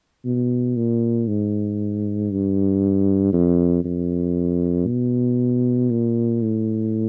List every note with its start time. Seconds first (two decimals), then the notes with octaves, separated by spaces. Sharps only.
0.25 B2
0.76 A#2
1.28 G#2
2.31 G2
3.33 F2
3.84 F2
4.87 B2
5.90 A#2
6.42 A2